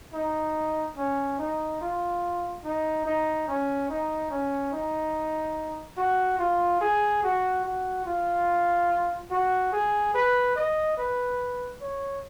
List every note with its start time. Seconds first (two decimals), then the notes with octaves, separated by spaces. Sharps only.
0.13 D#4
0.97 C#4
1.39 D#4
1.81 F4
2.64 D#4
3.06 D#4
3.48 C#4
3.89 D#4
4.30 C#4
4.72 D#4
5.97 F#4
6.39 F4
6.81 G#4
7.23 F#4
7.64 F#4
8.05 F4
9.31 F#4
9.72 G#4
10.14 B4
10.56 D#5
10.97 B4
11.81 C#5